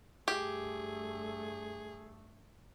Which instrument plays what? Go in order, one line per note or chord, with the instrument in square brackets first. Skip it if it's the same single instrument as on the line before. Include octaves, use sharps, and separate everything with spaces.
[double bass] G2 A3 [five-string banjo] G4 [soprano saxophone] G#4